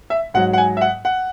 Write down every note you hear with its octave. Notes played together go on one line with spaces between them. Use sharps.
E5
G#2 F#3 F#5
F#5
G#5
E5
F#5
F#5